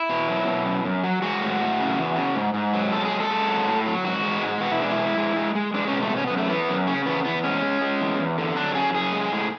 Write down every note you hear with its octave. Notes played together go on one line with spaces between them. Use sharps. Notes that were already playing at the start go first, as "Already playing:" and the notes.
Already playing: E4
B2
F#3
B2
F#2
F#2
F#3
G#3 F#4
A2
A2
C#3
E2
C#3
G#2
G#2
F#3
G#3 A4
G#4
G#3
A4
G#3
F#3
A2
F#3
G#2 F#4
G#3
G#2
B2 F#4
E4
G#3 D4
E4
G#3
G#3
G#3
G#3
G#3 D4
C#4
B2
A3
B2 C#4
F#2 B3
A3
E3 B3
F#2
C#3 C#4
E2 B3
E2 B3
G#3 C#4
G#3
G#3
E2
E2
D3
F#3 D4
C#3 G#4
F#2 G#4
G#3
A2